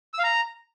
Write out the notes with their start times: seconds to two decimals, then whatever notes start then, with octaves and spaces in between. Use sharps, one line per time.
0.14 E6
0.19 F5
0.24 A#5